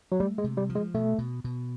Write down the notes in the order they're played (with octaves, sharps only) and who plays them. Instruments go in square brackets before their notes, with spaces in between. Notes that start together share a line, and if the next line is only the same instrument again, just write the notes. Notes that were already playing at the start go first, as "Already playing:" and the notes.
[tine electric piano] F#3
[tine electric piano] G3 [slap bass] A3
[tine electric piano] G#3
[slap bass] C3
[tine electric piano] G3
[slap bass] F3
[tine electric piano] G#3
[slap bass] B2 [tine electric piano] A3
[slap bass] B2
B2